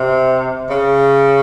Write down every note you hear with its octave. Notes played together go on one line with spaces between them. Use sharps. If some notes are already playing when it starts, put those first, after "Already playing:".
Already playing: C3
C#3